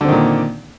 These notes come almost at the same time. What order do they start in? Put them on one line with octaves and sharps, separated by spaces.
D3 C4 D#3 A#2